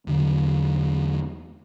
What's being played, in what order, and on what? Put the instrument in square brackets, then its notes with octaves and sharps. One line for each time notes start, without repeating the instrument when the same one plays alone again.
[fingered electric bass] E2 D3 F#3